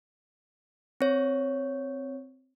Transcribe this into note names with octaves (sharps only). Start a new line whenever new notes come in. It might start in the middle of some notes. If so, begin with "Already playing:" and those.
C4 C#5